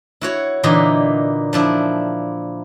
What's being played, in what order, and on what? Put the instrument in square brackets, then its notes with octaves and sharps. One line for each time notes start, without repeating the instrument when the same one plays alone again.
[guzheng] E4 F#4 C#5
A#2 D3 E3 D#4 E4
F3 D4 E4